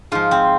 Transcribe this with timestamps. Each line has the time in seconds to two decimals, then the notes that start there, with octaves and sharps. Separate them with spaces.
0.12 G#2 F3 F4
0.31 C4